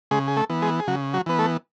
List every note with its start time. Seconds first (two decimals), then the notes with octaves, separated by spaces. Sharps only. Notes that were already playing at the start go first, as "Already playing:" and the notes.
0.11 C#3 G#3 G#4
0.28 G#4
0.37 A3 A4
0.50 E3 B3
0.62 G#3 G#4
0.80 G#4
0.87 C#3 F#3 F#4
1.13 F#3 F#4
1.26 E3 B3 B4
1.39 A3 A4